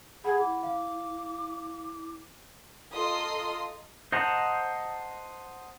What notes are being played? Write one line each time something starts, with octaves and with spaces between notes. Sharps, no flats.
G#4 F#5 B5
E4 D6
F5
F4 A4 D#5 A#5 C6 D#6
C5 D#5 F#5 A5 A#5